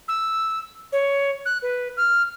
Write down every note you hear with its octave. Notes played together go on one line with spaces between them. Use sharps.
E6
C#5
F#6
B4
F6